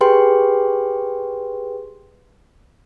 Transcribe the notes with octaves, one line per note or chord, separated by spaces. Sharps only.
G4 G#4 B4 G5 C6